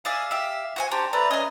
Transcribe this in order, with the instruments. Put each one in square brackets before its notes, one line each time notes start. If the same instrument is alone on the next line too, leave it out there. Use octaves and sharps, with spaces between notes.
[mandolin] G#4 D5 E5 [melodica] F5
[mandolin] G4 E5
F#4 C5 G#5
[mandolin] D4 [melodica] G4 C5 A#5
[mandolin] A3 [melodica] B4 D5 A#5
[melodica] C#4 G#5 D#6 [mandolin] G#4 D#5